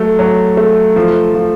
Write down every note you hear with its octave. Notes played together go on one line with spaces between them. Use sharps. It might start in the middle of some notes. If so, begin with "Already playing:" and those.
Already playing: F#3 A3
F#3
A3
F3
F3